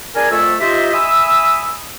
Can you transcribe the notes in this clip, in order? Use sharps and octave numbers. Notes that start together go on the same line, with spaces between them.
D4 G#4 A#4 G#5
F2 A3 E6
D#4 F4 G4 C5 D#5 E5
E5 G#5 B5 D#6 E6